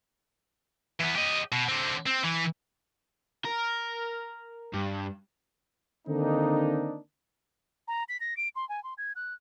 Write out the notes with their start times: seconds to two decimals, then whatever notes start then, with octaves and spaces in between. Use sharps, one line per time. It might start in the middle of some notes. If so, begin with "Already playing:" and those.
1.00 E3 B3
1.16 G4 D#5
1.52 B2
1.69 D3 C4
2.07 C4
2.24 E3
3.45 A#4
4.74 G2
6.08 D3 D#3 A#3 C4 D4 D#4
7.88 A#5
8.09 B6
8.20 A#6
8.37 D7
8.56 C6
8.69 G#5
8.84 C6
8.98 G#6
9.16 F#6